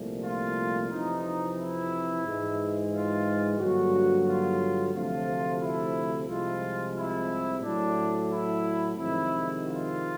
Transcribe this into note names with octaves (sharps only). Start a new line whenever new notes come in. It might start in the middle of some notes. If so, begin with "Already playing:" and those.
Already playing: C2 A#2 F3 A3
F4
F2 C3 E3 D#4
E4
G#2 E3 G#3
F4
G2 D3 F#3 A#3 F#4
F4
D2 C3 F3 A3 F4
E4
C2 C3 F3 G#3 F4
E4
A2 F#3 A3 D4
E4
F2 C3 D#3 G#3 E4
F4